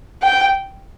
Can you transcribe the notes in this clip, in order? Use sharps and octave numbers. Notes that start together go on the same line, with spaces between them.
G5